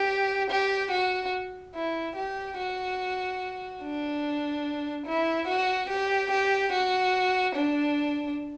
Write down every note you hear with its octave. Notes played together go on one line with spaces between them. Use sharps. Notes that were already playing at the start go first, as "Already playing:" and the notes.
Already playing: G4
G4
F#4
E4
G4
F#4
D4
E4
F#4
G4
G4
F#4
D4